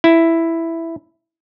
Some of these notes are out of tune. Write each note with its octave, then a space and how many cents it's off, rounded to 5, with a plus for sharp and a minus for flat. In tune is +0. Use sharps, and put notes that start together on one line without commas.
E4 +5